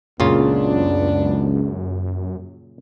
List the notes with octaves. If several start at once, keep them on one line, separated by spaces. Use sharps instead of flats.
C#2 F#2 A#2 C#3 B3 D4 F4